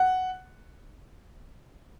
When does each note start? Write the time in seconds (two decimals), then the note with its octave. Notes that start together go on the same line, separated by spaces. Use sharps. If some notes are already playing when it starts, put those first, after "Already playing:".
Already playing: F#5